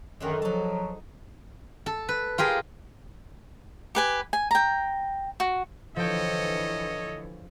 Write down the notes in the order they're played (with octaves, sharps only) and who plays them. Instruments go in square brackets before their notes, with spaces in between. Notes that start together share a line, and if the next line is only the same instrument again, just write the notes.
[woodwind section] F#2 D#3 [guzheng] D3 F#3 G#3
[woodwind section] F3 F#3 [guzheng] D#4 A5
[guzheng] A4
B4
F4 G4 G#4 A#4
[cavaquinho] G4 B4 G#5
G#5
G5 A#5
F#4
[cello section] D3 E3 [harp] F3 G5 [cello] A4 C#5 [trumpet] D#5